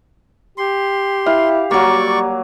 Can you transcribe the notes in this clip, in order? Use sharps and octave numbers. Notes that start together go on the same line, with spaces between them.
G4 C6
E4 F5
F#3 G3 A#3 D5 C#6